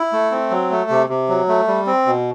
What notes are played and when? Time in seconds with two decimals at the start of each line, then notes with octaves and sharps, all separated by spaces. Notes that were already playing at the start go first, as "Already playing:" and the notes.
Already playing: E4
0.12 A3
0.31 C4
0.51 F#3
0.70 A3
0.90 C3
1.09 C3
1.29 F#3
1.48 A3
1.67 G3
1.87 C4
2.06 B2